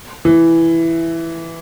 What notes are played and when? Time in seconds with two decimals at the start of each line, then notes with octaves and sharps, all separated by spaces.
0.25 E3